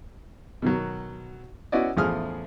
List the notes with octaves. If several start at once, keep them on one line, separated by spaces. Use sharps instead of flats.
B2 D#3 F#3
B3 C#4 E4 F#4 D5 D#5
A1 E2 F3 G#4 D#6 F6